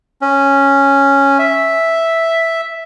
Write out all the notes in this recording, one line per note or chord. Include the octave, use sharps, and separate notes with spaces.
C#4
E5